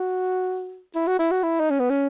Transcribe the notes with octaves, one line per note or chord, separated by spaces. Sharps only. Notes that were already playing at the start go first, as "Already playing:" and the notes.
Already playing: F#4
E4
F#4
E4
F#4
E4
D#4
C#4
B3
C#4